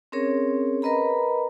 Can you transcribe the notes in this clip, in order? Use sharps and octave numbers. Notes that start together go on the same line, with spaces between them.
C4 C#4 G#4 A#4 C#5
A#4 B4 D#5 A#5 B5